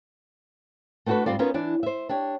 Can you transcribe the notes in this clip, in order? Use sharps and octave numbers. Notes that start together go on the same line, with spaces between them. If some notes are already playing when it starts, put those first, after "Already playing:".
A3 B3 D4 F#4 A4 B4
G#2 C#3 G3 C4 F4 D5
B3 C#4 D#4 F4 A#4 B4
E3 D4 D5
C5 E5
D4 G4 C#5